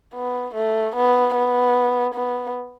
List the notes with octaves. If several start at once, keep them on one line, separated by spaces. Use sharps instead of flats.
B3
A3
B3
B3
B3